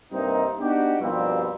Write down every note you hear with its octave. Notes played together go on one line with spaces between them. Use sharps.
G2 C3 A#3 C4 D#4
B3 D4 D#4 F#4 G4
G2 B2 F3 G3 A#3 C4